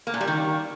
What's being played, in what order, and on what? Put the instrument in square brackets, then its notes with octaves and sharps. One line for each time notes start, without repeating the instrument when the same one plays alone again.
[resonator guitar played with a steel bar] A#3
A#2
G3
D#3